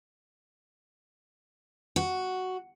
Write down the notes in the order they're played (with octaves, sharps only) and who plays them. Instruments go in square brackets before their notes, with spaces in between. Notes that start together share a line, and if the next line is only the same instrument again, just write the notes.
[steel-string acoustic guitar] F#4